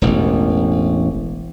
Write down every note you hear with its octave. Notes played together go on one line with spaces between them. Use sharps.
E1 A1